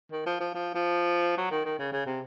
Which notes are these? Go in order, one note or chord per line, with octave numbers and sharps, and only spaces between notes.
D#3
F3
F3
F3
F3
F#3
D#3
D#3
C#3
C#3
C3